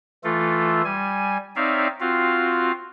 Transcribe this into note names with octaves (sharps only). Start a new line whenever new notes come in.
E3 A3 F4 A4
G3 G#5
C4 D#4 C#5 D5 E5 F5
C4 F4 F#4 F5